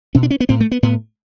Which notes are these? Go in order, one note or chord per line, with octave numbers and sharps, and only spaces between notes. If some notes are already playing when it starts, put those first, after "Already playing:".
B2 C#4
D4
C#4
B3
A2 C4
A3
B3
A2 B3